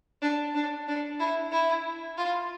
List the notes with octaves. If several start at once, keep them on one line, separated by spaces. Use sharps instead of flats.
D4
D4
D4
E4
E4
F4